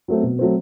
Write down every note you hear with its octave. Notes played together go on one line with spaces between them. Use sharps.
F#3 A3 C4
B2
F#3 A3 C4